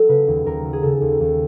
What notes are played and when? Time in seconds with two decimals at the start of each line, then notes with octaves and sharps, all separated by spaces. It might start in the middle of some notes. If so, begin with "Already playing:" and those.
Already playing: F#3 A4
0.09 C#3 B4
0.28 D#2
0.46 D#2 A#4
0.64 F#3
0.73 G#4
0.82 C#3 A4
1.01 D#2
1.20 D#2